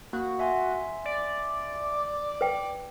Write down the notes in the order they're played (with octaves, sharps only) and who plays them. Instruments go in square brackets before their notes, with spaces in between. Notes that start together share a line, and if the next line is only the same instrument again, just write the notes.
[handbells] A#3 [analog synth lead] F#4
[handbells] E5 G#5 C6
[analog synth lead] D5
[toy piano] B4 G5